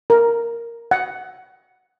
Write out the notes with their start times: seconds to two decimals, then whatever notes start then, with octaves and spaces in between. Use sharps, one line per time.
0.10 A#4
0.91 F#5